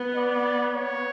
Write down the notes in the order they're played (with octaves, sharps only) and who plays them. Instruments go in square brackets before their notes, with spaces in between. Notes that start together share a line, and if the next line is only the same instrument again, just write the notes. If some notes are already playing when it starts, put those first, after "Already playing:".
Already playing: [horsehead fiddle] B3
[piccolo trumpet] D5
C#5